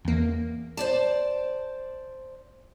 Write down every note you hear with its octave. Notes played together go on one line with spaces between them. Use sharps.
E2 A#3
C5 D5 A5